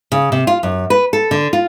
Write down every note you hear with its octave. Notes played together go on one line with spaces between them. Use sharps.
C#3
C3
F4
F#2
B4
A4
D3
F4